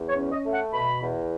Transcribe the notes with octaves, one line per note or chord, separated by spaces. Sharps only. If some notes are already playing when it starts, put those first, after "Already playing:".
Already playing: E2
C#5
C#4
D#5
A3
F#5
B2 B5
E2